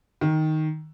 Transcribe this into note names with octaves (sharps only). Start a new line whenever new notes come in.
D#3